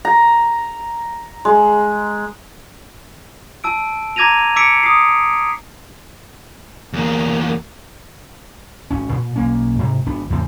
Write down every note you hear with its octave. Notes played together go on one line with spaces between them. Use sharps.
A#5
G#3
A5 E6 D7
A#5 D6 G#6 A#6 D#7 F7
D6 E6 B6 C#7 D7
D#6 C7
E2 A#3
G#1 C#4
A#2
B1 A#3 C#4
G#2 C3
G#1 B3 D4
E2 A2 C#3 C4